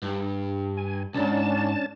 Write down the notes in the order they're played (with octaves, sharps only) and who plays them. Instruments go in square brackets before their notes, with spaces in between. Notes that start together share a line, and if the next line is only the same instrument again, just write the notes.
[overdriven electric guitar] G2
[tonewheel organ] G#5
[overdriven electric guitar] C2 G#2 [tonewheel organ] C#4 D4 A5